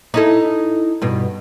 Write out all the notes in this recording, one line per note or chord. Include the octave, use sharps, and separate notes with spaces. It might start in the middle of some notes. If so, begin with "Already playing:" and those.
D#4 E4 A4
G2 B2